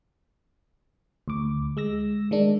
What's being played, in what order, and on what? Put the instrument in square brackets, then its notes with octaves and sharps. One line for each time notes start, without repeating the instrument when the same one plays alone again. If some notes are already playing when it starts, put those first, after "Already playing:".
[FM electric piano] D2 D6
G#3 E6 A#6
D#3 G#3 D4